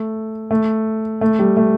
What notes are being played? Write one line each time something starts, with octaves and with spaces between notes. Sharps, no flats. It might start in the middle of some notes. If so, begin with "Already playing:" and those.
Already playing: A3
A3
A3
G3
A3